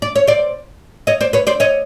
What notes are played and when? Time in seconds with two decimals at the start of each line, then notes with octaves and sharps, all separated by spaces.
0.02 D5
0.16 C#5
0.27 C5 D5
1.07 C#5 D#5
1.21 C5 D5
1.33 B4 C#5
1.47 C5 D5
1.60 C#5 D#5